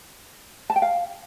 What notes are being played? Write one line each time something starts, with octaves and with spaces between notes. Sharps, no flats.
A5
G5
F5